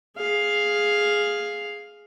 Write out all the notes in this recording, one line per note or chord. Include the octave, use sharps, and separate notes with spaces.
G#4 F5